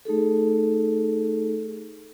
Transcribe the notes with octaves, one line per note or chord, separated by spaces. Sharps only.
A3 D#4 G#4 A4